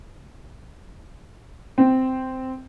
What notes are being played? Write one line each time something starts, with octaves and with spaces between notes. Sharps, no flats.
C4